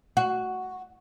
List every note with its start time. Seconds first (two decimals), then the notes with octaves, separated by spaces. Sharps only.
0.17 F#4